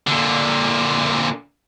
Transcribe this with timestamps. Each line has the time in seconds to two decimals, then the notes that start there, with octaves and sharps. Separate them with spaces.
0.07 A#2 D3